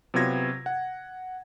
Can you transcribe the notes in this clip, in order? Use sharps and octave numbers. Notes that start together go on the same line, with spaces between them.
C3 F#3 B3 F4 G#6 A#6
F#5